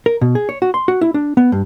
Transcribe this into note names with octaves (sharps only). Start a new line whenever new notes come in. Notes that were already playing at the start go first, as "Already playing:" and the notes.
A#4
B2
G#4
C#5
F#4
C6
F#4
E4
D4
B3
G2